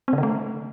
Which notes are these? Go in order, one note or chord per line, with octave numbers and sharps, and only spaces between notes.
C4
C#3
D3
A3